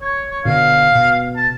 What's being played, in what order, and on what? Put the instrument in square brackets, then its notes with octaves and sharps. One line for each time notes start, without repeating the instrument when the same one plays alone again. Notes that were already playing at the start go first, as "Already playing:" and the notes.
[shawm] C#5
C#5
[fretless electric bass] B2 D3 [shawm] F5
[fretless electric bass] B2
[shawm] A5